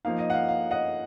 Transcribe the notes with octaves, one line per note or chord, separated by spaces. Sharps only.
F3 A#3 D#4 F5
D#5
F#5
F5
F5
D#5 F#5